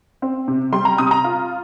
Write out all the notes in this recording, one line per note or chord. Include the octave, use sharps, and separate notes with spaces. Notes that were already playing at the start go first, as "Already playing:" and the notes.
C4
C3
G3 C6
A#5
C3 D#6
A#5
F4